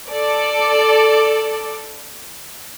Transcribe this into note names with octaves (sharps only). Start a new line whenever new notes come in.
A4 D5